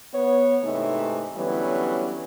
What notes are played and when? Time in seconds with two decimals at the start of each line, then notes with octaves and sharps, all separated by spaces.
0.13 B3 C#5
0.62 G#2 C3 E3 A3 D#4
1.35 D3 E3 F#3 G3 B3 C#4